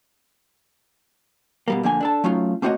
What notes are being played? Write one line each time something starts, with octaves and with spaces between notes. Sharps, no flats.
B2 G3 A#3
F2 D3 A#3 G#5
D4 A4 A5
F#3 A3 C#4 D#4 F4
A3 A#3 C4 F#4 C#5 D#5